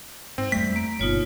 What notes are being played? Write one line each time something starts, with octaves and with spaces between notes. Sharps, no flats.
G#2 C4
F2 G3 A3 B6
A#3
G1 B2 D#4 F4 C#5